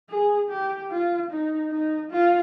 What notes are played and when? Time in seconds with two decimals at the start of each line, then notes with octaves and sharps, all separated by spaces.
0.10 G#4
0.51 G4
0.91 F4
1.31 D#4
1.72 D#4
2.12 F4